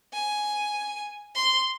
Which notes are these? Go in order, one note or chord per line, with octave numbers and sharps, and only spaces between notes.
G#5
C6